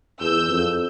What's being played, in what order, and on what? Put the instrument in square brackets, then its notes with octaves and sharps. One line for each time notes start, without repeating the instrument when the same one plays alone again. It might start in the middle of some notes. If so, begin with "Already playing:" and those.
[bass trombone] E2 [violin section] E6 G6
[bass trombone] F2